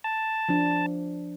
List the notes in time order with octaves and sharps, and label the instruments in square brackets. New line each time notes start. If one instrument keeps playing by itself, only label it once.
[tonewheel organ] A5
[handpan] F3 D4